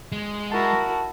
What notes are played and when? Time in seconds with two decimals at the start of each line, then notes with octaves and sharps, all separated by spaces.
0.12 G#3
0.51 E4 F#4 A#4 A5